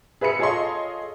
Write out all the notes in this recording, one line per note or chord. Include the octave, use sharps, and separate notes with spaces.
G#4 B4 E5 B5 C#7
F4 G#4 A4 C#5 D#5 C6